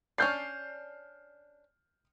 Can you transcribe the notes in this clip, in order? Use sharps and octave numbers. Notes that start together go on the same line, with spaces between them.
C#4 D4 D5 F6 G6 C7